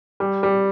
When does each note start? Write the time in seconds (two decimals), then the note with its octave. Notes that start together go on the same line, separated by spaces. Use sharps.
0.20 G3
0.43 G3